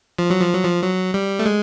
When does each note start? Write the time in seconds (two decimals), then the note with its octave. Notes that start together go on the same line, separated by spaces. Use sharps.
0.19 F3
0.30 F#3
0.41 F3
0.53 F#3
0.65 F3
0.82 F#3
1.14 G3
1.39 A3
1.46 G#3